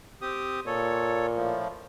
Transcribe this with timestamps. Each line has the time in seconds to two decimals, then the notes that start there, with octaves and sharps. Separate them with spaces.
0.22 C4 G4 D#6
0.67 A#2 A4 C#5
1.34 A2 F3